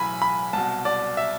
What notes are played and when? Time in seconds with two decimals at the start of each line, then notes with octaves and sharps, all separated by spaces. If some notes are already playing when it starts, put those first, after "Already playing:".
Already playing: B1 A2 E3 G#5 B5
0.22 B5
0.53 C2 B2 A5
0.85 D5
1.17 E5